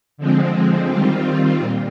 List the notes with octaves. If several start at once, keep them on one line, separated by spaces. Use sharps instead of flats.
D3 F3 G#3 C4
D#3 G3 C4 F4
A#2